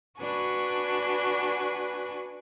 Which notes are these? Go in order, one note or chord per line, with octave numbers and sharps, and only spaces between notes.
D4 F#4 B4 G#5 C#6